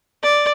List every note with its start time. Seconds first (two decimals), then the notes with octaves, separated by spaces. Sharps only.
0.23 D5